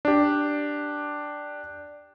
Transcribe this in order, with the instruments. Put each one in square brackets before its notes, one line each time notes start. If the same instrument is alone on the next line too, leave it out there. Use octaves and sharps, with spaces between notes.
[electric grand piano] D4 G4